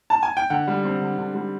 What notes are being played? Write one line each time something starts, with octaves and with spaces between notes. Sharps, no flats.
A5
G#5
G5
D3 F#5
G3
C4
D3
D3
G3